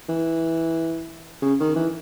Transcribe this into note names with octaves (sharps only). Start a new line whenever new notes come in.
E3
C#3
D#3
E3